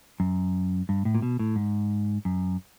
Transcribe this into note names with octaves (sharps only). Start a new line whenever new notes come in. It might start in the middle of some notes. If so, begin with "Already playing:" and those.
F#2
G2
A2
A#2
B2
A2
G#2
F#2